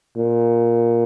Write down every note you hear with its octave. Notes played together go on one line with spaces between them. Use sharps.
A#2